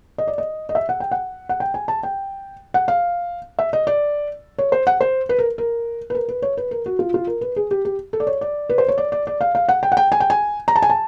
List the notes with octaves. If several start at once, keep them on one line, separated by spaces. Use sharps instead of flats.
D#5
D5
D#5
D#5
E5
F#5
G5
F#5
F#5
G5
G#5
A5
G5
F#5
F5
E5
D#5
D5
C#5
C5
F#5
C5
B4
A#4
A#4
B4
A#4
B4
C#5
B4
A#4
F#4
F4
F4
A#4
B4
G#4
G4
G4
A4
D5
C#5
D5
B4
C5
C#5
D5
D5
D5
F5
F5
F#5
G5
F#5
G5
G#5
G5
G#5
A#5
A5
G#5
A5